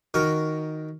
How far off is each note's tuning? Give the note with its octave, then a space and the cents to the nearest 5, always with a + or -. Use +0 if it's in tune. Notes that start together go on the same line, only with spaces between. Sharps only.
D#3 +0 F#4 +0 A#4 +0